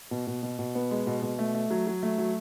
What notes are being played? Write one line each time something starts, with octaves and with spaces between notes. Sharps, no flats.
B2
B2
B2
B2
B3
G#3
B2
B2
A3
A3
F#3
F#3
A3
F#3